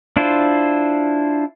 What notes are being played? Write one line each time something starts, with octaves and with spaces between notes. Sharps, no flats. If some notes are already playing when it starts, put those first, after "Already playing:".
D4 E4 F4 C5